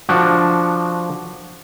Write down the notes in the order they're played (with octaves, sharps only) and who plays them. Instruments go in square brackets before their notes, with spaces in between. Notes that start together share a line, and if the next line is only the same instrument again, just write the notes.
[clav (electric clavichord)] F3 D4 F#4